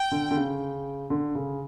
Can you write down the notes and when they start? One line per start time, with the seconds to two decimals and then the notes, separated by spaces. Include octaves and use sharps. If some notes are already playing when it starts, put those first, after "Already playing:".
Already playing: G5
0.11 D3
0.31 D3
0.36 C#3
1.10 D3
1.35 C#3